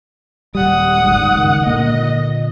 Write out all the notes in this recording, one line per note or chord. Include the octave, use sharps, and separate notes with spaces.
D#1 G3 F#5 D#6
G1 G#2 G3
C#2 D#3
A#2 D3 A#3 D#5